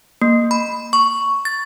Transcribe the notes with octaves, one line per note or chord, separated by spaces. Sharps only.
A#3
B5
C#6
A6